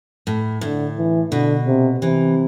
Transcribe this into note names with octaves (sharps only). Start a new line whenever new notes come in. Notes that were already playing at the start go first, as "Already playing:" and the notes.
A2
A2 D3
E3
B2 D3
C3
C3 E3